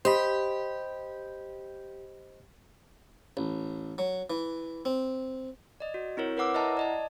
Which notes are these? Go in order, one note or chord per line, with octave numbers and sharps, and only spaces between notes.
G4 C5 D#5 B5
A1
F#3
E3
C4
D5 D#5
F#4
C4 E4 A#4 C#5
A#4 B4 C#5 F#5 D6 E6
E4 D#5 E5 F#5 A5 A#5
D5 D#5 A5